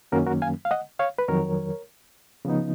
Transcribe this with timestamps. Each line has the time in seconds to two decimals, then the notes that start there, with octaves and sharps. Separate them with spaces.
0.12 F#2 D#3 F#3 A#3 C#4 F#4 A#4
0.27 F#4 A#4
0.42 F5 G#5
0.65 F5
0.71 D#5 F#5
0.99 C#5 F5
1.18 B4
1.28 F2 D#3 F#3 A#4 C#5
2.45 C#3 F3 B3 D#4